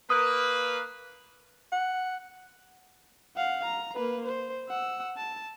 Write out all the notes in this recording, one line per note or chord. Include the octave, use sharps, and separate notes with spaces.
A#3 B4 D#6
F#5
F5 F#5
A#5
A#3 B4
C5
F#5 E6
A5